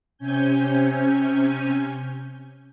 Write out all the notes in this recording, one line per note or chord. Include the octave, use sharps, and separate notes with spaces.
C3 C#4 G#5 G6